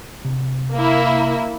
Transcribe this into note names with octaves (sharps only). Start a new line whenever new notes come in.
C3
A#3 E4